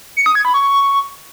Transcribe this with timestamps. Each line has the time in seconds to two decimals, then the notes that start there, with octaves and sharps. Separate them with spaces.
0.17 C#7
0.26 D#6
0.35 G#6
0.45 B5
0.54 C#6